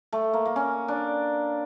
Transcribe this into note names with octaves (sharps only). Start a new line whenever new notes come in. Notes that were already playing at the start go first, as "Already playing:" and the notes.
A3
A#3
A#3
C#4
D4